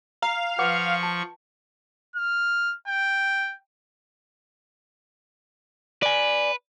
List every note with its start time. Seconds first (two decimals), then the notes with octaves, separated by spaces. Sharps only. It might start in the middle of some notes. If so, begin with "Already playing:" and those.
0.22 F5 A#5
0.59 F3 B4 F#5 C#6 D6
1.03 A5
2.16 F6
2.88 G5
6.03 B4 D5 G#5